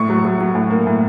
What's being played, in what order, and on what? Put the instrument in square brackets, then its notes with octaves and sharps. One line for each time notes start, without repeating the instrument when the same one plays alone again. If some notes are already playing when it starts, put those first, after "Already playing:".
Already playing: [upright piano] A2 C#6
F#3
F#3
F#3
A2
A#3
A2